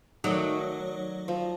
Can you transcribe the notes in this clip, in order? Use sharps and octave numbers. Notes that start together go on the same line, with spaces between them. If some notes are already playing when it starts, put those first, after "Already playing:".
D#3 F#3 A3 D#4 C#5 D5
F3